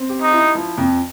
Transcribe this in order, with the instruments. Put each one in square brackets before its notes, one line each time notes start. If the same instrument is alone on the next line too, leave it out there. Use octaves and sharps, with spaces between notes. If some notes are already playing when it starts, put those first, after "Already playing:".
Already playing: [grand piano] C4
G4
[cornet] D#4
[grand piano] E4
F3
F2